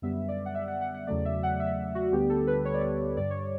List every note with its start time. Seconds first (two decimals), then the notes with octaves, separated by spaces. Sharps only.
0.02 F#2 D3 G3 B3 E5
0.28 D5
0.46 F#5
0.55 E5
0.68 F#5
0.81 F#5
0.95 F#5
1.07 E2 C#3 F#3 A3 D5
1.25 E5
1.43 F#5
1.60 E5
1.95 F#4
2.12 D2 D3 G3 B3 G4
2.30 A4
2.47 B4
2.65 C#5
2.74 D5
2.82 C#5
3.17 G2 D3 G3 D5
3.30 C#5